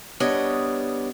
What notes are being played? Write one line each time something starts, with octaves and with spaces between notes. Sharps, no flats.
G3 B3 D4 C#5 D#5